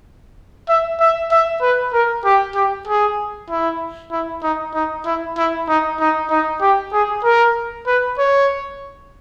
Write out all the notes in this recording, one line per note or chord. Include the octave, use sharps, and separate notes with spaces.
E5
E5
E5
B4
A#4
G4
G4
G#4
E4
E4
D#4
D#4
E4
E4
D#4
D#4
D#4
G4
G#4
A#4
B4
C#5